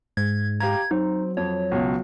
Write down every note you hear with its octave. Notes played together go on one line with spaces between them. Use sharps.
G#2 G#6
G4 F5 A#5 G#6
F#3 C4 D#4
F2 C#5
C#2 B2